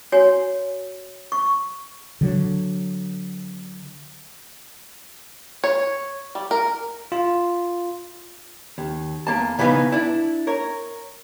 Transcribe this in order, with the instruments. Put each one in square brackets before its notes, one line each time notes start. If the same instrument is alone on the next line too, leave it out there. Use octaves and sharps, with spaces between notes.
[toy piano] F#4 C#5 G#5
C#6
[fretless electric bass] D3 F#3
[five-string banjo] C#5
G3
A#4
[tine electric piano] F4
[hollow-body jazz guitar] D#2
E2 A#3 A5
C#3 E3 F3 B3 D#4 F5
D4 E4
A#4 C#5